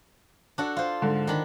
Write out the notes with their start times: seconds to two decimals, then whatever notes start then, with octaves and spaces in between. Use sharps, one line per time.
0.58 D4 F#4 A4
0.77 F4 C5
1.02 G#2 D3
1.27 D#3 D4 B5